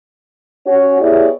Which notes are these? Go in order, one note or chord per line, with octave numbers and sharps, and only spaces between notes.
C#4 F#4 C#5
B3 E4 G4 G#4 C#5 D5